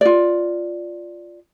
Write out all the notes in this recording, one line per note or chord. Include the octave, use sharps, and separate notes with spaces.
F4 D5